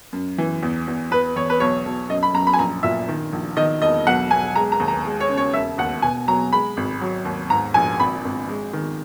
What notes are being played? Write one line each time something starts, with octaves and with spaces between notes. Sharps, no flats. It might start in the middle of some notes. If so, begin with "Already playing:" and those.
F#2
E3
E2
E2
E2 B4
E2 C#5
B4
B1 C#5
B1
F#2 D#5
B5
F#2 A#5
B5
G#5
A#1 A#5
A#2 E5
D#3
A#1
D#3 D#5
E1 D#5
B1 F#5
B1 G#5
G#3 A#5
A#5
D#2
A#5
G#3
C#5
C#3
C#5
E1 E5
D#2 F#5
B2 G#5
F#3 A#5
G#3 B5
G#1
F#3
D#2
G#2 A#5
A#1 G#5
G#1 B5
G#1
G#3
D#3